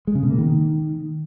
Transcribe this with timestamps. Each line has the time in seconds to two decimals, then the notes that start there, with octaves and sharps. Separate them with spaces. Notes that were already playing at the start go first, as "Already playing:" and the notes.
0.07 G#3
0.15 C#3
0.23 B2
0.31 A#3
0.38 D#3